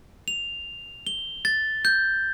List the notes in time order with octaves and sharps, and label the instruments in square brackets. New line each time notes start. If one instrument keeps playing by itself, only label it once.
[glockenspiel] F7
G7
A6
G6